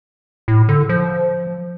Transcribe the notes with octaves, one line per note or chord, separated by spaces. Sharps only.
A2
D3
F3